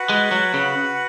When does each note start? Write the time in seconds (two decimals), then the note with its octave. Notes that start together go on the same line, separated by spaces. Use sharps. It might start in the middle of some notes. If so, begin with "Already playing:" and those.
Already playing: F#4 B4 F#5
0.09 G#3
0.31 F#3
0.54 C#3